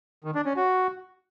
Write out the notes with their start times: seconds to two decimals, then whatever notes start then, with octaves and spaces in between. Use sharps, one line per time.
0.24 D#3
0.35 D4
0.46 C#4
0.56 F#4